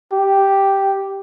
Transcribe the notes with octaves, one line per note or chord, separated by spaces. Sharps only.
G4